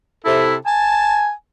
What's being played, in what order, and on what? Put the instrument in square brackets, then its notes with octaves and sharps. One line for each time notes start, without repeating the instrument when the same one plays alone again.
[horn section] C3 A4 [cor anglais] E4
[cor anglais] G#5 [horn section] A5